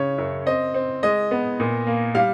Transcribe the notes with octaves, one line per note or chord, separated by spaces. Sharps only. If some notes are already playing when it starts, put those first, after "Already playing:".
Already playing: C#3 C#5
F#2
C4 D#5
C4
G#3 D#5
B3
A#2
A#3
G3 F5